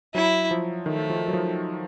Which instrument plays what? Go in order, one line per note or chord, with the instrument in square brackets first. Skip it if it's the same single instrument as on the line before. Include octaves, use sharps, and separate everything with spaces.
[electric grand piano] F#3 [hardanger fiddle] E4
[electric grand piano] F3
[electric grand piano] D#3 [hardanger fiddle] A3
[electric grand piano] F3
F#3
F3